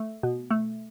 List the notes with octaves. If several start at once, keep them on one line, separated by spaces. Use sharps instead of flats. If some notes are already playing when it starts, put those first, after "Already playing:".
Already playing: A3
B2
A3